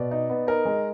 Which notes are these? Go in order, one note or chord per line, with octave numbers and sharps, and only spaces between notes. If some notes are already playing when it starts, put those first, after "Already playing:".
Already playing: B2 D5
D#4
B3
D#4 A#4
G#3